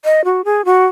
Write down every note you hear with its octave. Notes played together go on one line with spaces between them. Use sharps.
D#5
F#4
G#4
F#4